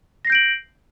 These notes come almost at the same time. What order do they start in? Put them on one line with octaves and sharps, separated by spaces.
A#6 C7 G6 D7 F#7